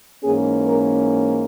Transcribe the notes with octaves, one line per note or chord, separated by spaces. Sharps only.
G#2 E3 A#3 C#4 G#4
A#4